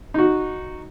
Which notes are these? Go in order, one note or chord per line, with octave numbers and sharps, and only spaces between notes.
D#4 F#4